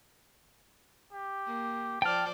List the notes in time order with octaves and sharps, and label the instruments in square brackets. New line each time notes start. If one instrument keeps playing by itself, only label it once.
[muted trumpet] G4
[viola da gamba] A#3
[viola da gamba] F3 C5 D5 [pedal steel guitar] G5 F6 [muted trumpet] A5